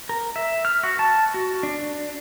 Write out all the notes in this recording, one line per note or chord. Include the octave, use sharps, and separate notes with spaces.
A#4
E5
F6
F#4
A5
F#4
D4